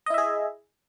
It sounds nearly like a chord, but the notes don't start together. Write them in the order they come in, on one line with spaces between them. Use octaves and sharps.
D#5 E4 E5 G#4